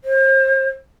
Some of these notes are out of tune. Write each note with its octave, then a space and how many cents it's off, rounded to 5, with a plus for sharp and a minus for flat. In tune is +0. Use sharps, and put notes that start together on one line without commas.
C5 +40